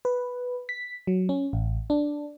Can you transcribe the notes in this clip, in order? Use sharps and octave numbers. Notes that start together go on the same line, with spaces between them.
B4
B6
F#3
C#4
A1
D4